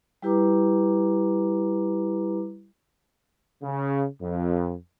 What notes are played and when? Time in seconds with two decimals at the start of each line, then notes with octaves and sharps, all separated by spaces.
0.22 G3 E4 G4 B4 A#5 D6
3.63 C#3
4.21 F2